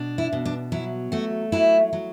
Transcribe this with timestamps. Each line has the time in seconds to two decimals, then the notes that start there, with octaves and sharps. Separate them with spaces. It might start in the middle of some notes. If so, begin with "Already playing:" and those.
Already playing: B2 D4
0.18 E4
0.33 B2
0.45 D4
0.72 F#3 E4
1.12 A3 F#4
1.52 F#3 E4
1.93 F#3